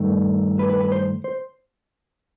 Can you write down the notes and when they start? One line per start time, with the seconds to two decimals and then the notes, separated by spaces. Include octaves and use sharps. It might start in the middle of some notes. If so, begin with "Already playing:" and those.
Already playing: G2 D#3 A3
0.59 B4
0.70 B4
0.80 B4
0.92 C5
1.24 C5